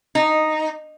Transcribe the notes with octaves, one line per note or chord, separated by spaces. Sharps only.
D#4